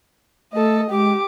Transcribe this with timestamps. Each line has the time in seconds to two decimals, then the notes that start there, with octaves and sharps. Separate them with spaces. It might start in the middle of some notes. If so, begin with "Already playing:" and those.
0.53 A3 A4 D#5
0.90 G#3 G4 D6